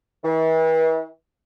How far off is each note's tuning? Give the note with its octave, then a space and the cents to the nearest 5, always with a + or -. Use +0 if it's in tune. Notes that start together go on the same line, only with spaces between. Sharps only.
E3 -40